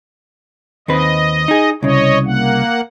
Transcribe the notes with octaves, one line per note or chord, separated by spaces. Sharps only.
D#2 C4 B4 D#5
D#4 G#4
C2 C#3 C#5 D#5
A#3 F#5